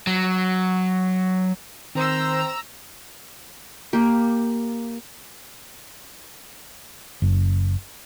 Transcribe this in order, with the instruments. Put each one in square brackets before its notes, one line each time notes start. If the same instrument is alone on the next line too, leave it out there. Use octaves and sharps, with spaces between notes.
[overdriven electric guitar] F#3
[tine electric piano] D#3 [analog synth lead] C4 [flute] C5 [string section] A#5 E6
[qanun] A#3 G4
[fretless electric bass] F#1